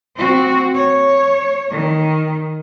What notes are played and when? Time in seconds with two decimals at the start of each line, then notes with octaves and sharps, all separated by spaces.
0.16 C4 F#4
0.74 C#5
1.71 D#3